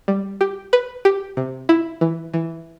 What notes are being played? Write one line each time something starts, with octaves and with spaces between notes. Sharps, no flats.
G3
G4
B4
G4
C3
E4
E3
E3